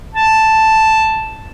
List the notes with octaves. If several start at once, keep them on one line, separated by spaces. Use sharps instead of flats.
A5